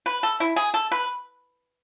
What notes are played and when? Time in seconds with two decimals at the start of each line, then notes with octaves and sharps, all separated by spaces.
0.06 B4
0.23 A4
0.40 E4
0.56 G#4
0.74 A4
0.92 B4